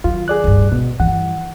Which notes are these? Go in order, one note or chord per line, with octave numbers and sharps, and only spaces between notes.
D#3 F#3 F4
G#4 D5 F#6
D1 G2
G#1 B2 B3
G2 E3 F#5